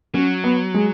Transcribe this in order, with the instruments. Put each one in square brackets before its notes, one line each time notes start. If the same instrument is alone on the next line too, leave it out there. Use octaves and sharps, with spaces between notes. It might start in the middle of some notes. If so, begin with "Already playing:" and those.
[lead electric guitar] F#3 [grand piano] C#4
[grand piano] B3
G#3